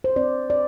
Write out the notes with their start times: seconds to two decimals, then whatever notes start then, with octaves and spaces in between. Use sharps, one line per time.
0.04 C5
0.16 C4 D5
0.50 D5